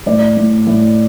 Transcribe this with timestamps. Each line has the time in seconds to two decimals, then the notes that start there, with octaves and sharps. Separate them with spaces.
0.06 A2 D5
0.37 A2
0.67 A2